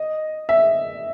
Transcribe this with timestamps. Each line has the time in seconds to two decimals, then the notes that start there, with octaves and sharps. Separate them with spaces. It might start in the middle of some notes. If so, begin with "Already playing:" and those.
Already playing: D#5
0.49 E5